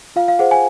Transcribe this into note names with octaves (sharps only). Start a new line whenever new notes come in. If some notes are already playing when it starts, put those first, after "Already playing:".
F4 F5
F5
G#4 C5 F#5
G#5